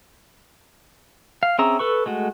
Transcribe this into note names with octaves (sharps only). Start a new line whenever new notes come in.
F5
C4 C#4 G#4 E5 A#5
A4 B4 C#6
G#3 A3 F#4